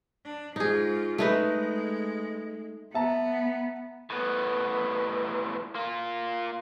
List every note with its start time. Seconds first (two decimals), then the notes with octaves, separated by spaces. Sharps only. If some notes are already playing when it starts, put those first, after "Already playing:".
0.25 D4
0.56 G#2 D#4 F4 G#4
1.18 G#3 A3 D#4 B4
2.94 B3 E5 A5 A#5
4.10 A2 B3
5.75 A#3 F4